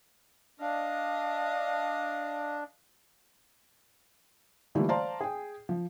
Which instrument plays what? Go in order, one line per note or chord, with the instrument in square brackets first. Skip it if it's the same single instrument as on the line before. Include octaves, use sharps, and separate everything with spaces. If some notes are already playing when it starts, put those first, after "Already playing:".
[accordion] D4 [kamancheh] D#5 F5
[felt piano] D3 E3 G3 A3 A#3 F4
C5 D5 F5 A5 A#5 C6
G#4 G5
F3